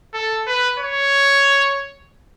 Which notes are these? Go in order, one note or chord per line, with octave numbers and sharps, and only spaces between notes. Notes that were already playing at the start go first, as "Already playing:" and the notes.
A4
B4
C#5